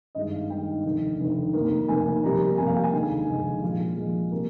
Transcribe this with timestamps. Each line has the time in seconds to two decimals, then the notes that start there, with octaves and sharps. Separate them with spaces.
0.15 G#1 G2 D#3 G#3 D#5
0.32 F5
0.49 G#1 G2 D#3 G#3 G5
0.85 F1 D#2 D3
1.19 F1 D#2 D3
1.53 F1 F2 D#3 A#3
1.88 F1 F2 D#3 A#3 G#5
2.23 F2 C3 G3 A#3 A#5
2.58 F2 C3 G3 A#3 G#5
2.67 F5
2.76 G5
2.84 G#5
2.93 F1 D#2 D3 G#3
3.27 F1 D#2 D3 G#3
3.63 A#1 A#2 F3 G#3 F5
3.97 A#1 A#2 F3 G#3
4.32 C3 G3 A#3